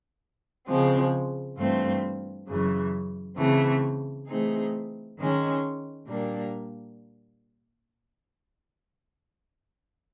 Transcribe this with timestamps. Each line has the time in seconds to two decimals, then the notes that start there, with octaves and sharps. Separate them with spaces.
0.67 C#3 F3 G#3 C4
1.56 G2 E3 A3 C4 F4
2.47 F#2 C#3 E3
3.37 C#3 E3 A3 C4
4.27 E3 A3 C4 D#4 G#4
5.17 D#3 G#3 C#4
6.07 A#2 G3 A#3 D4